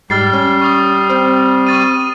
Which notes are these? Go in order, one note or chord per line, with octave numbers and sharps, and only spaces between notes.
G#2 G3 F6 A6 C7
C#4
C#6 D#6
C4
C#6 A6 D#7